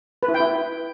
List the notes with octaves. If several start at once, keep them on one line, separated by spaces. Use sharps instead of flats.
B4
E4
G5
E4